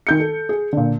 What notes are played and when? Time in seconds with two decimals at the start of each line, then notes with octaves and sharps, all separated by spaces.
0.07 D#3 G6 C#7
0.20 A4
0.49 G#4
0.73 A#2 D3